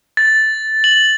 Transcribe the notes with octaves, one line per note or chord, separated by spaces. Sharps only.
A6
F#7